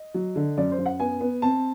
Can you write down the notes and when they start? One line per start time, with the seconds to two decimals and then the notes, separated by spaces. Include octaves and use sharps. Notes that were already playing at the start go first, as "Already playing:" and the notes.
Already playing: D#5
0.14 F#3
0.36 D3
0.57 F#2 D5
0.72 C5
0.78 F#2
0.86 F#5
1.00 B3 G#5
1.21 B3
1.42 C4 A5